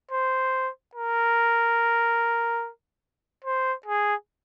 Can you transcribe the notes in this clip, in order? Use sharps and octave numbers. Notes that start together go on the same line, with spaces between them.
C5
A#4
C5
G#4